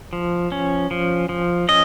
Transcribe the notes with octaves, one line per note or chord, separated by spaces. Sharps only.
F3
C#4
F3
F3
C#4 D#5